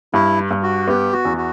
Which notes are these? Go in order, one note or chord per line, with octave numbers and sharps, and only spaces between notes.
G2 E4
G2
F#4
B3 G4
F#4
E2
F#4